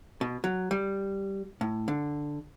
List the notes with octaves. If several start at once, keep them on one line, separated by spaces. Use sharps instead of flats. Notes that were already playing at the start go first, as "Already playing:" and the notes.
B2
F#3
G3
A2
D3